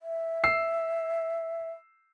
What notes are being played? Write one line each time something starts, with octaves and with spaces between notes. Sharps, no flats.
E5
E6 C7